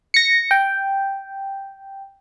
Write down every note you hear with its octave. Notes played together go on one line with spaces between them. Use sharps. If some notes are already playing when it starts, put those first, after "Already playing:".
A#6 C#7
G5